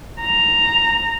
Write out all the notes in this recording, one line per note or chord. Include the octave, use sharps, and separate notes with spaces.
A#5